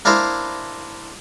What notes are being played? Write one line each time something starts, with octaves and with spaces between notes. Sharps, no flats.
A#3 D4 E4 A#4 C5